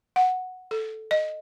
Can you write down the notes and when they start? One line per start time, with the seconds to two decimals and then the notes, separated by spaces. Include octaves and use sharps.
0.16 F#5
0.71 A4
1.11 D#5